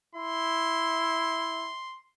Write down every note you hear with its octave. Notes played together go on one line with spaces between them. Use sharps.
E4 C6